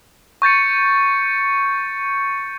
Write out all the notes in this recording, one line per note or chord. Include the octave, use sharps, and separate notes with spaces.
C#6 G6 A6 C#7